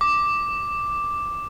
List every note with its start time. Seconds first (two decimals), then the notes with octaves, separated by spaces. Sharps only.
0.01 D6